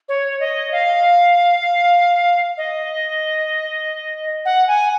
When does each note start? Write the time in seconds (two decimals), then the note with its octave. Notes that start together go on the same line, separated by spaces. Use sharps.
0.09 C#5
0.40 D#5
0.72 F5
2.57 D#5
4.45 F#5
4.68 G#5